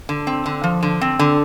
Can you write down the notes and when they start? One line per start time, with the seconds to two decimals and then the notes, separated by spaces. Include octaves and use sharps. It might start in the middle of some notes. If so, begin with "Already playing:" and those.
0.09 D3
0.27 C4
0.46 D3
0.64 F3
0.83 D3
1.01 C4
1.19 D3